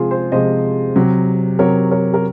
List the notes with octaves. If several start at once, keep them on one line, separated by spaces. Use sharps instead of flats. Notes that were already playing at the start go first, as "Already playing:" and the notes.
Already playing: C3 F3 G#3 F4 G#4
G#4 C5
C3 F3 G#3 C5 D#5
C3 F#3
C3 F#3 A#4 C#5
A#4 C#5
A#4